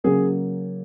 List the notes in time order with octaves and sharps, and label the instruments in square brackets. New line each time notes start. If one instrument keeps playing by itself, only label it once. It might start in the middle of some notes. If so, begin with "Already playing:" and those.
[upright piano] C#3 F#3 A#3 G#4